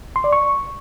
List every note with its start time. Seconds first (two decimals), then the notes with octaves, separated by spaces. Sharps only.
0.16 C6
0.24 D5
0.32 C#6